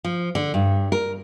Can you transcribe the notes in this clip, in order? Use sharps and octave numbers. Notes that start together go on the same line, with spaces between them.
F3
D3
G2
A#4